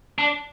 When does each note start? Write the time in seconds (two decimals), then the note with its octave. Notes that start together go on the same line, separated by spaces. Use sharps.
0.19 D4